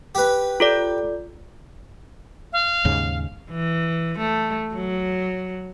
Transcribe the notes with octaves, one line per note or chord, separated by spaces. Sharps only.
G4 B4
F4 A4 D5
F5
D#2 G#2 C#3
E3
A3
F#3